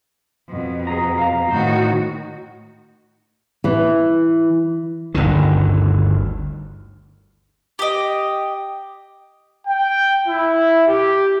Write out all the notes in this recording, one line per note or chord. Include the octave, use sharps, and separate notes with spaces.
F2 B2
G#4 A#5
F5 A#5
A2 D#3 F#4 C5
E3
G1 D2 D#3
G4 D#5
G5
E4
G4